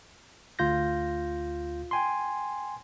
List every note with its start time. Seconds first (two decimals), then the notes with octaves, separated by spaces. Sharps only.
0.59 D2 F4 G6 A#6
1.91 G5 G#5 C6